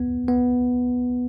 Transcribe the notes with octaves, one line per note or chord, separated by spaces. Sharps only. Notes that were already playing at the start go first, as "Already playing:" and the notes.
Already playing: B3
B3